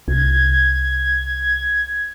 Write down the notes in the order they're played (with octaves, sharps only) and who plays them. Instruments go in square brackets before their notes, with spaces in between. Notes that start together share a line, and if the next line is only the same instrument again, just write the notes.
[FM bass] C2 [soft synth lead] G#6